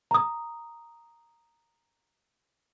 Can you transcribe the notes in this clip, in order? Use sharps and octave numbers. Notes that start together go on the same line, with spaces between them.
A#5 D#6